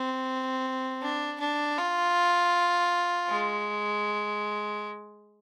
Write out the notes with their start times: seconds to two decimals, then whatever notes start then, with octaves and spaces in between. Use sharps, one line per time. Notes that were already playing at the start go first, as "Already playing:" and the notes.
Already playing: C4
1.02 D4
1.40 D4
1.78 F4
3.30 G#3